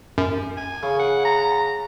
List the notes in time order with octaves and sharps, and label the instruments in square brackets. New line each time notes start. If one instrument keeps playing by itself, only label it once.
[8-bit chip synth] F#2
[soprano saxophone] G#5
[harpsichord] C#3
[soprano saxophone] F#5
A#5